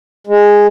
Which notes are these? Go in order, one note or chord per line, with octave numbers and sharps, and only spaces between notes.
G#3